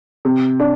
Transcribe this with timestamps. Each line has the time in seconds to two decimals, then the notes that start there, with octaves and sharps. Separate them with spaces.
0.25 C3
0.60 D4